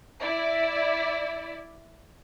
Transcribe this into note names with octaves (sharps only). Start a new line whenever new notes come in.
E4 D5